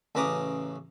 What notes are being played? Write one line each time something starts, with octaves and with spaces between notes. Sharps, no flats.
A1 C#3 B4 A#5 D6 D#6